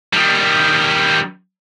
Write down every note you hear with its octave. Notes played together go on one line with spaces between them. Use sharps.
D#3 G3